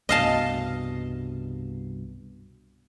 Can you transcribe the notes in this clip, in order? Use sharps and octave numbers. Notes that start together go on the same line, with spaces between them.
C2 G2 B2 D#5 F5 A5